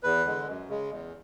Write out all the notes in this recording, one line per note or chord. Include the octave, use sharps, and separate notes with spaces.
E2 B4
D3 G#3
F#2
C#3 G#3
E2